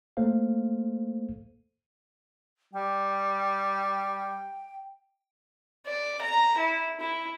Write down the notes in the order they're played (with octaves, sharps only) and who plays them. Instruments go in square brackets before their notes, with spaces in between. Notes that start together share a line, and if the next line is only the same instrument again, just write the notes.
[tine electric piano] A3 A#3 A4 C5 F5
[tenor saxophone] G3 [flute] G5
[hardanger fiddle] D5
A#5
E4
E4